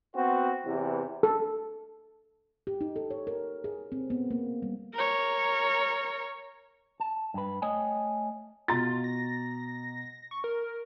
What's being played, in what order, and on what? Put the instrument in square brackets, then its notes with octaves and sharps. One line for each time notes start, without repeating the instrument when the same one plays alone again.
[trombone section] B3 C4 F#4 C5
E2 C3 E3
[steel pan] A4
[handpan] G4
D#4
A4
C#5
A#4
G#4
C4
B3
A#3
G3
[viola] A#4 C#5
[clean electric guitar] A5
G2 B4
A3 C#5 D#5 G5 G#5
[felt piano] B2 A#5 A6 [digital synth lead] F4
[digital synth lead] A#6
C#6
A#4